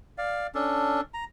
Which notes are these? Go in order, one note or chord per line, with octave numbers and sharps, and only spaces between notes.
D5 F5
C#4 D4 A4
A#5